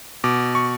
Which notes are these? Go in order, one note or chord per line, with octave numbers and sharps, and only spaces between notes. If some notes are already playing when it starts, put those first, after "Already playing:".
B2 D6
C#6